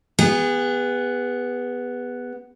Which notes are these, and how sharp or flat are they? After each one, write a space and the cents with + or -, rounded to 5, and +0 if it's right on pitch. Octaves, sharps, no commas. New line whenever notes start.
B3 +0 G#4 -35